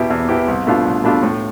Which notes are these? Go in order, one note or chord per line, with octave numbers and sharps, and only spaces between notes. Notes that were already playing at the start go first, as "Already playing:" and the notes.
Already playing: E2 B2 B3 E4 G4
E2
B2 B3 E4 G4
C2
B2 A3 D4 F4
C2
B2 A3 D4 F4
A2